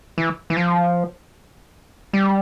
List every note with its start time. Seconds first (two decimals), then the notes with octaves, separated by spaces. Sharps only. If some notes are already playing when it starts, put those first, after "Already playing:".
0.18 E3
0.50 E3
0.57 F3
2.13 G3